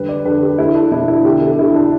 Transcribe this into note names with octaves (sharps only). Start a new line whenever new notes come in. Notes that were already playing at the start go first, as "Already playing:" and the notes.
Already playing: D3 G3 B4
D5
D3 B4
G4
A3 E4
D4
B2 E4
E4
D3 G4
A4
D3 E4
D4